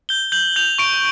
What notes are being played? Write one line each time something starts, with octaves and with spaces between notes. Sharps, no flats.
G6 G7
G6 F#7
G6 F7
C#6 D7